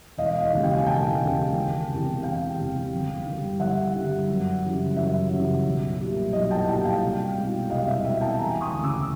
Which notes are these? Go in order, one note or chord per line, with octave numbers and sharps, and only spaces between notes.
E1 D#5 F5
D#5 F5
D#2 C#3 E3 G#3
F5 G5
G#5
E1 G5 A5
D#2 C#3 E3 G#3
E1
E2 C3
E1 F5 G5
E2 C3
G1
G2 D3 G3
G1 E5 F#5
G2 D3 G3
F#2
C#3 E3 G3
F#2 E5
C#3 E3 G3
B1
A#2 G3
B1 D#5
G5 A5
A#2 G3 G5 A5
F5 G5
C2
B2 G#3
C2 D#5 F5
E5
B2 G#3 E5
G5 A5
E1 G#5 A#5
C#6 D#6
D2 C#3
D6 E6